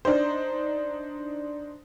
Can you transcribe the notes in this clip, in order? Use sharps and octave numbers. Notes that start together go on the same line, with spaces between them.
D4 D#4 C5